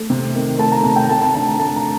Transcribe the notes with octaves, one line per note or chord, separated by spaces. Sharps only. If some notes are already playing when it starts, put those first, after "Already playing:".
Already playing: A3
C3
D#3
A3 A5
A#5
C3 A5
G5
A3 A5
A5
D3 A5
A#5
A3 A5
A#5